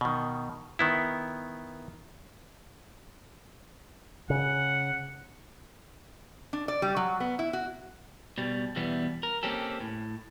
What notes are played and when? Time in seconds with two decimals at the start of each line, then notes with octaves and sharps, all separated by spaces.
0.01 B2 D#3
0.79 D#3 B3 E4
4.30 C#3 F#5
6.53 D4
6.68 D5
6.82 G3
6.97 F#3
7.20 B3
7.39 E4
7.53 F#4
8.38 B2 G3
8.76 E2 B2 E3 G3 B3
9.23 A#4
9.43 A#3 C4 C#4 G4 A4
9.80 A2